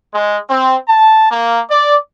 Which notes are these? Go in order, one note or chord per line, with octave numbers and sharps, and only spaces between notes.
G#3
C4
A5
A#3
D5